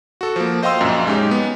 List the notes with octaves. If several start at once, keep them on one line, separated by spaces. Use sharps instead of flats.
F#4 A4
F3 A#3
C5 D#5 F5 G5 C6 E6
A#1 F#2
G#3 C#4 D#4 G4
B3